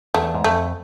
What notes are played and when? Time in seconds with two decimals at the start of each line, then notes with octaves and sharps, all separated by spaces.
0.14 E2 A3
0.35 G#2
0.44 F2 A3